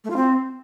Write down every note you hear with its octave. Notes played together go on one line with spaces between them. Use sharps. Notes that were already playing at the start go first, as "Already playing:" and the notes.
A3
F4
C4